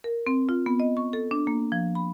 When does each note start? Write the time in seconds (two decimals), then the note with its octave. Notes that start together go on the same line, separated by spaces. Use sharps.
0.04 A#4
0.27 C4
0.49 F4
0.66 B3
0.80 D#5
0.97 C#6
1.13 A4
1.31 D4
1.47 A#3
1.72 F3
1.95 B5